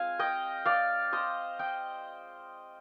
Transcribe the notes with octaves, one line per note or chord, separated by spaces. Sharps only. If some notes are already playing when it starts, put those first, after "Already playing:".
Already playing: G#3 C4 F4 F5 G#5
D#5 G5
D5 F5
C5 D#5
D#5 G5